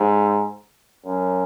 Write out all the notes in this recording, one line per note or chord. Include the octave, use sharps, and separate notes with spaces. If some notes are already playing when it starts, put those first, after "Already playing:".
Already playing: G#2
F#2